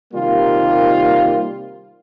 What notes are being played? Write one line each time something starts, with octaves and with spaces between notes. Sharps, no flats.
C3 D#3 G3 A#3 F4